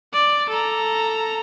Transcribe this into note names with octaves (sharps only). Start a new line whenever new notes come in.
D5
A4 A#5